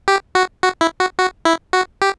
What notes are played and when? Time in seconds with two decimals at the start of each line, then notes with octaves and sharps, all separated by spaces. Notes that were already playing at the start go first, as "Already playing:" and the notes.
0.08 G4
0.35 F#4
0.63 F#4
0.81 E4
1.00 F#4
1.18 F#4
1.45 E4
1.73 F#4
2.02 G4